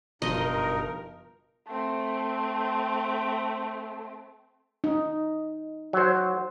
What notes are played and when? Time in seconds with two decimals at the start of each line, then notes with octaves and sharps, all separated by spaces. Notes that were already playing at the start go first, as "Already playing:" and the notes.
0.22 F#1 G2 B2 F3 D#4 A#4 D#5 C6
1.68 A3 C4
4.84 D#4
5.93 F#3 C5